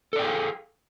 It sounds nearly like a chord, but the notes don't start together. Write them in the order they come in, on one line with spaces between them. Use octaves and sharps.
A4 D5 G5 G#4 F5